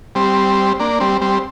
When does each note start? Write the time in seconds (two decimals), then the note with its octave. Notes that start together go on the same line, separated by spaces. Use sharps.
0.15 G3 C4
0.80 A#3 D4
1.00 G3 C4
1.21 G3 C4